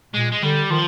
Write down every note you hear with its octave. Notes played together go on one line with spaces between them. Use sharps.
A#2 G#3
G#3
D3 G3
D#3 F3